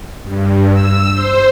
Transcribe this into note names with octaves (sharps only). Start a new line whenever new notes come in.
G2
E6
C5